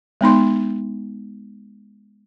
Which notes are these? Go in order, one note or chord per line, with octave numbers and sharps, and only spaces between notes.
G#3 B3 D#4 C6